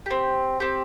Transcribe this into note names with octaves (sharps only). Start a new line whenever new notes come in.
C4 G4
C4 G4